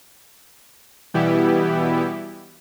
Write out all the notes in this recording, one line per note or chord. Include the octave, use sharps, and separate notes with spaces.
B2 E3 G3 B3 E4 G4